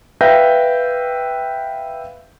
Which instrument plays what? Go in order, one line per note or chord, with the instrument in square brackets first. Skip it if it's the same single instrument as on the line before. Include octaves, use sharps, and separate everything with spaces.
[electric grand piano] B4 E5 F5 G5 G6 A#6